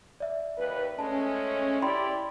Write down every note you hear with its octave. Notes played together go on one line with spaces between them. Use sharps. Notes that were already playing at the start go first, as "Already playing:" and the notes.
D5 E5
D#2 B4
G#3 A3 C#4 A5
E4 G4 D5 G5 B5 C6